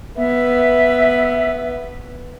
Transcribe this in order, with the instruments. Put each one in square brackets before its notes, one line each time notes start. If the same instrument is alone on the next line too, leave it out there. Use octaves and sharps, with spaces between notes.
[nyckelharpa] B3 B4 [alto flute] E5